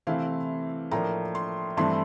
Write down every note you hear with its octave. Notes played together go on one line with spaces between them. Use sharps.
C3 E3 A3 C4 E4 F5
A2 F3 A#3 D4 A#5
C6
G2 E3 A3 C4 E4 C6